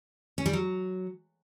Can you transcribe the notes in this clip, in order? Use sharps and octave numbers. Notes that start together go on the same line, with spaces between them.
C#4
G3
F#3